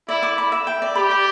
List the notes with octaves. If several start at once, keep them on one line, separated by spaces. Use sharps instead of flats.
E4 D5
D6
B5
E5
G5
D5
G4 B5
D6